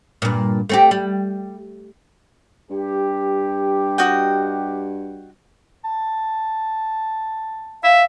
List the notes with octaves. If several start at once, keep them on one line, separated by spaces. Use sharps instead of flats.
G2 A#2
A3 C4 G4
G3
G2 G4
F#4 D#5 G5
A5
E5 F5